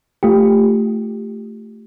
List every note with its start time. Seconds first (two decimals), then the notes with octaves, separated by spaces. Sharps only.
0.23 A3 F4 G4